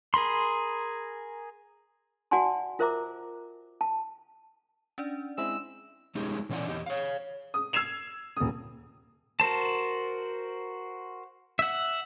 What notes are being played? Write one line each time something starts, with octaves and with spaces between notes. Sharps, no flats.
G#4 A#4 B5 C6
F#4 D5 F#5 G#5 A5 C6
F4 A#4 C5 E5 A#5 D6
A5
C#4 D4 D5
G#3 C4 E4 E6
G#3 C#4 D#4 G4 G#4
A#2 E3 C#4 D5 F#5
E2 G4 D#5
C#5 F5
D#6
E6 G#6 C7 E7 F7
D#1 D#6
F#4 A#4 C5 A5
E5 F#5